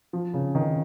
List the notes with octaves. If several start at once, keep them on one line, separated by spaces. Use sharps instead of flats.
F3
C#3
D#3